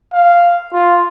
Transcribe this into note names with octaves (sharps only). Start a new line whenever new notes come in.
F5
F4